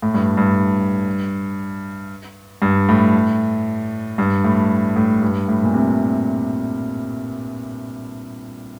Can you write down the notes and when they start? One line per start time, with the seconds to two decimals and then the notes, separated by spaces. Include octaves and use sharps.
0.02 A2
0.14 G2
0.37 G2
2.62 G2
2.89 A2
4.18 G2
4.44 A2
4.96 A2
5.22 G2
5.48 A2
5.63 A#2
5.74 C3